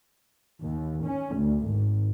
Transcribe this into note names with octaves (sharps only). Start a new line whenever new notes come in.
D#2
C#4
D2
G#1